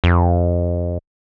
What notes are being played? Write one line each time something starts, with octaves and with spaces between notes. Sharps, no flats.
F2